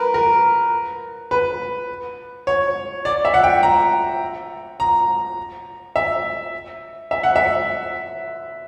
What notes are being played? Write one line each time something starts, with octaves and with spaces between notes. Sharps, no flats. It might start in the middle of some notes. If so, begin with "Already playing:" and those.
Already playing: A#4 B4
A#4
B4
C#5
D5
E5
F#5
G5
A#5
A#5
E5
E5
F#5
E5